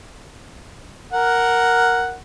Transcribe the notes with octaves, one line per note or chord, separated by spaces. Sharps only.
A#4 F#5